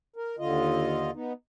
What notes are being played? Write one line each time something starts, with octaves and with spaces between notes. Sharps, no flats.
A#4
D#2 D3 F4 D#5
B3 D#4